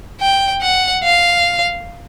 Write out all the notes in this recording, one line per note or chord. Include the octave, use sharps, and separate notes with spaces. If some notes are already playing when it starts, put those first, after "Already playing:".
G5
F#5
F5